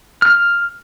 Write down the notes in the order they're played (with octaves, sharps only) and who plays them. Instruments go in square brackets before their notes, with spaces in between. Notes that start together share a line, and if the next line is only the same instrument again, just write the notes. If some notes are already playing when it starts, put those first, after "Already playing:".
[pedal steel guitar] F6